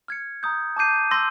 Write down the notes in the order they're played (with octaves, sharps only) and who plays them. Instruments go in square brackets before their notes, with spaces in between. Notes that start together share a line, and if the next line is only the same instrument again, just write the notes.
[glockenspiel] F6 G#6 C#7
A#5 D#6 G6
A5 D6 G6 C7 D#7
C6 E6 G6 A#6